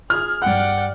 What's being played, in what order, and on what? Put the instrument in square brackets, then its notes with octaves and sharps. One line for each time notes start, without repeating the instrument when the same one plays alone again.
[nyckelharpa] G#4 [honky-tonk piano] F6
[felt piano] G2 F#6 [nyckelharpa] D5 G5 [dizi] F#5